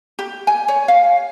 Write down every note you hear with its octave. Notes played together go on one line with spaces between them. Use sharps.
G4
G#5
C#5
F5